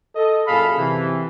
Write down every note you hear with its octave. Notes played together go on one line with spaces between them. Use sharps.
A4 D#5
F#2 A#2 G#4 A4 F5 B5
C3 E3